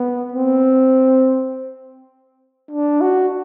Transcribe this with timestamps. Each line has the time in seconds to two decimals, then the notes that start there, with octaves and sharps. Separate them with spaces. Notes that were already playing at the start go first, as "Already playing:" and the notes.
Already playing: B3
0.34 C4
2.71 D4
3.01 F#4